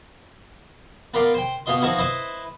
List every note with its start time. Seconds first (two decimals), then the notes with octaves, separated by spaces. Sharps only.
1.14 B3 F4 A#4 B4 D5 F5
1.34 C5 G5
1.66 B2 B3 F4 D#5 C6
1.82 F3 B3 D#4 E4 F#4
1.99 E4 B4 C5 D#5